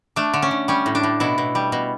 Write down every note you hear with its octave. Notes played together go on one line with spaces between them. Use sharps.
A3 D4
D3
C#4
D3
G3 C#4
A2
D4
A2
B2 E4
B2
G3
B2